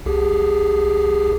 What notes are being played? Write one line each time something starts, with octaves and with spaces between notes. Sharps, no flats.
C2 G4 G#4